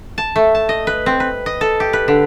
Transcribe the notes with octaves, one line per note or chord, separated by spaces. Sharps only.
A5
A3
A5
D#5
B4
C4
B4
D#5
A4
G4
B4
D3